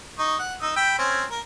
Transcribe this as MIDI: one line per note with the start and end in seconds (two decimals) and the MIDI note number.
0.19 0.37 63
0.19 0.37 85
0.39 0.55 78
0.62 0.74 63
0.62 0.74 88
0.76 0.96 79
0.76 0.96 83
0.76 0.96 88
0.99 1.24 60
0.99 1.24 61
1.30 1.40 70